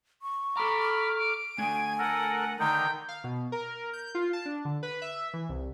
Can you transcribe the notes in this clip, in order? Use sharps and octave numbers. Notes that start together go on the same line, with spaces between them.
C#6
A4 A#5 B5 D6 F6
D7
A3 D4 G#5 G#6
A4 A#4 F#5
D3 D#3 D#4 G5 A#5
F5
B2
A#4
G6
F4
A5
D4
D3
B4
E5
E3
C2